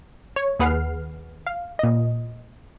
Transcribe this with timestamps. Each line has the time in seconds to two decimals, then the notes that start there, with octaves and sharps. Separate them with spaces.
0.36 C#5
0.59 D#2 G#4 B4 F#5 F6 C7
1.47 F5
1.79 A#2 D#5